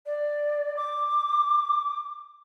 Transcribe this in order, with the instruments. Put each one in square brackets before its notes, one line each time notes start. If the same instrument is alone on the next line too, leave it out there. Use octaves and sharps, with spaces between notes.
[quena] D5
D6